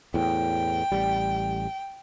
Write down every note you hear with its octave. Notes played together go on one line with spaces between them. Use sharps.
E2 A2 G5
A1 G3